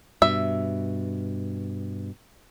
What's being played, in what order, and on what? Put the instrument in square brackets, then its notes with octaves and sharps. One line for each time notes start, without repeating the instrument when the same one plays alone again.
[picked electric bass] G2 B2 [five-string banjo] E5